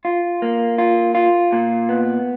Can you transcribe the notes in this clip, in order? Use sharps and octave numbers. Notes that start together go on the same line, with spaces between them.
F4
A#3
F4
F4
A#2
B3